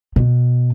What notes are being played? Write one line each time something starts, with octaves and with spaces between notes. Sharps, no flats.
B2